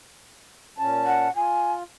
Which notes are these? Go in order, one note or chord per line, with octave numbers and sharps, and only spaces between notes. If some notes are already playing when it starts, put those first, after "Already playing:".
A#2 C#4 A5
F#5
F4 G#5